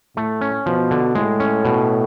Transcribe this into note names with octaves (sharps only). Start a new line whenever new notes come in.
A2 A3
C#4
B2 F3
D3
A2 G#3
C#4
B2